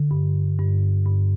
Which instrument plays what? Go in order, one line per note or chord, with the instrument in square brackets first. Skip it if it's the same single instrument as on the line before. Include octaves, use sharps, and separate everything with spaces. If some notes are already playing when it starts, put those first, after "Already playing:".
Already playing: [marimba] D3
G2
G2
G2